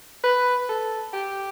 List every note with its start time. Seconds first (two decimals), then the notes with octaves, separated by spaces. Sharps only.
0.23 B4
0.69 A4
1.13 G4